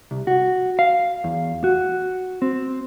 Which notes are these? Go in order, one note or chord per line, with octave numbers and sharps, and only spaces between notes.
C2
F#4
F5
E2
F#4
C4